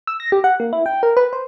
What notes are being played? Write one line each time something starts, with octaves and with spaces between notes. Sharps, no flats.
E6
A#6
G4
F#5
A#3
E4
G5
A#4
B4
C5